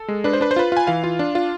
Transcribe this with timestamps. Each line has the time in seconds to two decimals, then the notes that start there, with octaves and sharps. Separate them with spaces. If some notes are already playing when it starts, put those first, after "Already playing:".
Already playing: A4
0.08 G#3
0.24 D4 B4
0.33 C5
0.41 D4 B4
0.51 C5
0.56 F4 B4
0.72 F4 G#5
0.87 E3 F5
1.04 F4
1.19 D4
1.35 F4